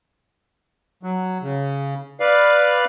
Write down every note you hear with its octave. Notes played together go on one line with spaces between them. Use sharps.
F#3
C#3
B4 D5 F5